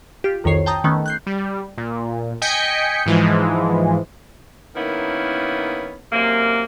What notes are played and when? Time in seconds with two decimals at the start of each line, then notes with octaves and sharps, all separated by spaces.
0.24 F4 G4
0.44 C2 F2 D#3 C#5 C7
0.66 G5 A5 A#5 D#6 G6
0.84 D#3 A3 B3 C#4
1.06 F#6 G6 C7
1.27 G3
1.78 A#2
2.42 D#5 G5 G#5 G6 B6 C#7
3.06 G#2 E3 F3 G#3
4.75 D#3 A#3 B3 C#4 E4
6.12 F#2 C3 A#3